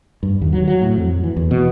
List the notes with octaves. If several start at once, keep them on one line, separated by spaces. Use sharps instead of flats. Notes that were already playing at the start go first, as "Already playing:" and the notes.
G2
D#2
F#3
F#3
A2
F2
E3
E2
B2